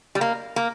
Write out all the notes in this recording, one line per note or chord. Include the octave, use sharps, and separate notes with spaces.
G3
A#3
A#3